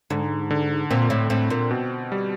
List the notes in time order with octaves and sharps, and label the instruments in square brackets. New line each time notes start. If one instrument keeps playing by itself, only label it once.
[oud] G#2 [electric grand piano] D3
[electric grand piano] D3
[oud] A#2 [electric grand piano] C4
[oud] A2
[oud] A2 [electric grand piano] C4
[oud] A#2
[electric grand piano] B2
G3